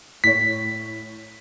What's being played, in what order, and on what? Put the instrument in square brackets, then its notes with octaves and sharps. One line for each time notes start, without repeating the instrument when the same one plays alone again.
[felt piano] A2 C#5 [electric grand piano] B6